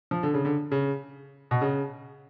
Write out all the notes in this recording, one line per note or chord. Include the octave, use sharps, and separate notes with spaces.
F3
D3
C#3
D3
C#3
B2
C#3